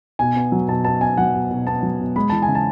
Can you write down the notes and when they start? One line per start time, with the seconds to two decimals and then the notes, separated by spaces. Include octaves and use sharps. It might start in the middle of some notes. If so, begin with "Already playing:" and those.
0.19 B2 G#5
0.35 B3
0.52 F#3
0.68 B2 A5
0.85 B2 A5
1.01 B3 G#5
1.18 F#3 F#5
1.35 B2
1.51 B2
1.67 B3 A5
1.83 F#3
2.00 B2
2.16 G#3 B5
2.30 E3 A5
2.42 G#5
2.48 C#3
2.55 A5